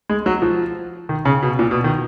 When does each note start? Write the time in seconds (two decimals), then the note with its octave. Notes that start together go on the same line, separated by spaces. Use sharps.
0.09 G#3
0.26 F#3
0.42 F3
1.09 D#3
1.25 C#3
1.42 B2
1.59 A#2
1.71 B2
1.84 D#3